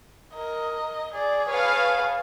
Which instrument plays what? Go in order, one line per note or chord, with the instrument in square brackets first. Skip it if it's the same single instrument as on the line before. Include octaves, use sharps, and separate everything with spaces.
[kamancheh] A#4 [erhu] D#5
[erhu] G#4 [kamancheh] D5
[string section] B4 F5 [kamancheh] C#5 A5